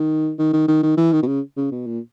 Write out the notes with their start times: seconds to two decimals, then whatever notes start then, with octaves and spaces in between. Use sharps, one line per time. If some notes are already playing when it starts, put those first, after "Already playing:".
Already playing: D#3
0.39 D#3
0.53 D#3
0.68 D#3
0.83 D#3
0.97 E3
1.12 D#3
1.23 B2
1.27 C#3
1.57 C#3
1.71 B2
1.86 A#2